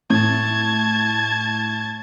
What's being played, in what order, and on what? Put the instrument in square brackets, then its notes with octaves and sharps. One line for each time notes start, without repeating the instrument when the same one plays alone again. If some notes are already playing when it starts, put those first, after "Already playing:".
[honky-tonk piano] A2 [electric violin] A5 G#6